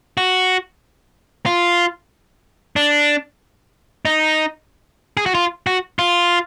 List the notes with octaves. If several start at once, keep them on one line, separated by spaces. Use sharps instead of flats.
F#4
F4
D4
D#4
G#4
F#4
F4
F#4
F4